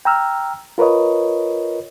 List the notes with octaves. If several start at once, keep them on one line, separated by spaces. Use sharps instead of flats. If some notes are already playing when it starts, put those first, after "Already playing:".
G5 A#5 E6 F6
F4 A#4 B4 C#5 D#5